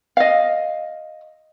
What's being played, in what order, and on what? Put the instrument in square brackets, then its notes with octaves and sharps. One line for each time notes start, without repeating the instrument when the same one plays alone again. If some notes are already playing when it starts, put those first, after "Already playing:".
[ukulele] D#5 F5